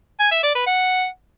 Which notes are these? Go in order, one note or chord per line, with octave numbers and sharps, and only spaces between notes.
G#5
E5
D5
B4
F#5